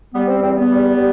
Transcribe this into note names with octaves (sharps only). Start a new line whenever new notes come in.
G3 B3
C4
E2 C4
B3
G3
G3